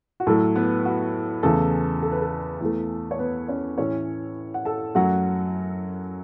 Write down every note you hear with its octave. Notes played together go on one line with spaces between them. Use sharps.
F#4
A2 F#3 A3 A4
B3 B4
F#4
E2 C#3 E3 A3 A4
A4
B4
A4
E2 E3 A3
C#5
B3 B4
C#4 C#5
A2 E3 A3 C#4 C#5
F#5
A4 A5
F#2 F#3 A3 F#4 F#5